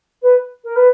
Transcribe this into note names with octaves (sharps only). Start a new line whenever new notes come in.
B4
A#4
B4